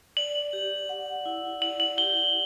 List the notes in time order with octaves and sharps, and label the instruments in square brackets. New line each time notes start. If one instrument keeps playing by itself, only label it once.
[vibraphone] D5 [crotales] F#7
[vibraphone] G4
F#5
E4
[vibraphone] D5 [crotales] F#7
[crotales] F#7
[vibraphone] G4 [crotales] G7